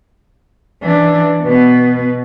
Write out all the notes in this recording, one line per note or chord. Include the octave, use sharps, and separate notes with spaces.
E3 D4
B2 B3